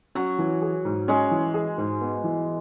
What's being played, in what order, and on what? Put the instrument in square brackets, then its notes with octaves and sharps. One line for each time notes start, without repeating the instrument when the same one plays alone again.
[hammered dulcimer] F#3 [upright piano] C#4
[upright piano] E3
G#4
G#2
[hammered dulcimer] G#3 [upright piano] C#4
[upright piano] E3
G#4
G#2
B3
E3